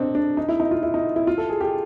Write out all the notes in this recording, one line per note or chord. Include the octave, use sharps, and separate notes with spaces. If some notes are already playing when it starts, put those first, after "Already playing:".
Already playing: C4 D4 D#4
D4
D#4
E4
D#4
F4
E4
D#4
E4
F4
A4
G#4
G4